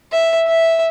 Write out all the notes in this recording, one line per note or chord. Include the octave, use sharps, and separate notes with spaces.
E5
E5